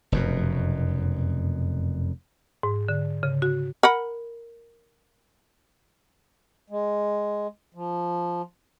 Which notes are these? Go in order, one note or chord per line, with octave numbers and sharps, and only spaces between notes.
F1 F#2 B2
G#2
D3
C#3
F#4
A#4 F#5 B5
G#3
F3